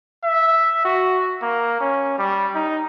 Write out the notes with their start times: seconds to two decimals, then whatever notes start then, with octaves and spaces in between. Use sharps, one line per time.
0.24 E5
0.85 F#4
1.42 A#3
1.80 C#4
2.18 G3
2.55 D#4